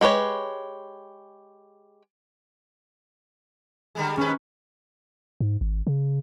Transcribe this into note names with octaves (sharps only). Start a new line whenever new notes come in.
G#3 G4 B4 C#5
D3 G3 G#3
D#2 G#2 C#4 B4
G#2
G#1
C#3